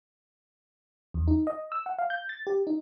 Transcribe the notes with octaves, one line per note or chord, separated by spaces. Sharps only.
E2
D#4
D#5
E6
F#5
F5
G6
A6
G4
D#4